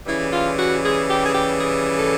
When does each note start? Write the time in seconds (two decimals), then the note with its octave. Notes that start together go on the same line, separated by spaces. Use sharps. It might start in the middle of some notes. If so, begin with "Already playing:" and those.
0.06 C#3 E3 G3 E4
0.31 F4
0.57 F#4
0.83 G#4
1.09 G4
1.24 G#4
1.33 G4
1.60 G#4
1.97 A4